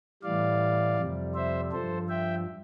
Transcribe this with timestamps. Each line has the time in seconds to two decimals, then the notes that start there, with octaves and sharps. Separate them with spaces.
0.23 A2 E3 G3 D5 F5
0.97 F2 C3 G3
1.35 C5 E5
1.72 G2 F3 A4 C5
2.09 E5 G5